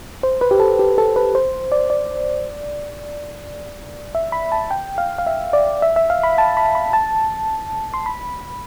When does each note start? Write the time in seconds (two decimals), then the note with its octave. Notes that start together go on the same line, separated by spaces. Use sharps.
0.23 C5
0.41 B4
0.51 G4
0.60 A4
0.79 G4
0.98 A4
1.16 B4
1.35 C5
1.72 D5
1.90 D5
4.15 E5
4.32 B5
4.52 A5
4.71 G5
4.98 F5
5.18 F5
5.26 E5
5.53 D5
5.82 E5
5.96 E5
6.10 F5
6.23 B5
6.38 A5
6.57 B5
6.75 B5
6.93 A5
7.94 C6
8.06 B5